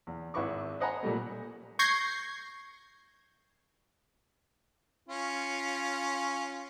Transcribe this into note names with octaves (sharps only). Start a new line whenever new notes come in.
E2
G#1 E4 B4 C#6 D6
C5 D#5 F#5 G#5 A#5 B5
A#2 G3 A3
C#6 G6 G#6 A#6 C7
C#4 F4